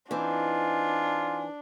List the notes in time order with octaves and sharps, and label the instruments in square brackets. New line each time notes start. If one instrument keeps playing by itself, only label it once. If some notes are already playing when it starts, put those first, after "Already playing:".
[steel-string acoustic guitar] E3 C4 D#4 [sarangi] D4 [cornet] F4 [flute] G#5